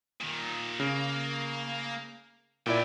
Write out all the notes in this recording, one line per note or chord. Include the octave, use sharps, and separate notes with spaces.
A#2 D#3
C#3 A#3
A#2 E4 G#4 D5 G5